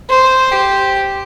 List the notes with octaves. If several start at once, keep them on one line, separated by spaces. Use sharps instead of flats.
C5
G4